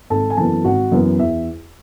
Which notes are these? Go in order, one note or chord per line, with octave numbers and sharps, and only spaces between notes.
G#1 A4 A5
G#5
F#2 E3 B3 A4 A5
G#1 F#4 F#5
F#2 E3 B3
E2 E5